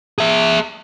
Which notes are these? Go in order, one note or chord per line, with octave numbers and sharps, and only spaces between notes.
G#4 E5